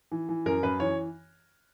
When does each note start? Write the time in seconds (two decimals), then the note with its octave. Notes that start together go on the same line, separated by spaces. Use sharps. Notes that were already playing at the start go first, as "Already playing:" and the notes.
0.12 E3
0.29 E3
0.46 F#2 A#4
0.63 F#2 B4
0.80 E3 C#5